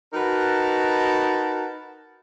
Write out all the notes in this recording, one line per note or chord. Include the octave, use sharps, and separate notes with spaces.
D#4 F#4 A#4 B4 F#5 A5